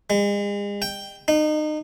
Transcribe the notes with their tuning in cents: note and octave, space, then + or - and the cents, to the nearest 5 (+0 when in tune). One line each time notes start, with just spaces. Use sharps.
G#3 -40
G5 +5
D#4 -30